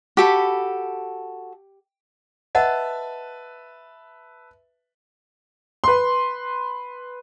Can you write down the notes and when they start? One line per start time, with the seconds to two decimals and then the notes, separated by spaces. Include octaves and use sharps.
0.17 F#4 G4 A4 B5
2.55 B4 D#5 E5 F#5 A5
5.84 B4 C6